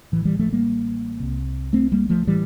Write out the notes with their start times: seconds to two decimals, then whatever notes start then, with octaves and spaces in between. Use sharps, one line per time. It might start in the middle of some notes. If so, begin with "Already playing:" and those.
0.12 A1 A2 E3
0.25 E3 G3
0.39 F3 A3
0.52 G3 A#3
1.20 C2 C3
1.73 A3 C4
1.92 G3 A#3
2.09 F3 A3
2.27 A2 E3 G3